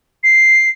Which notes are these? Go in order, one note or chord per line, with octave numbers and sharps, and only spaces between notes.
C7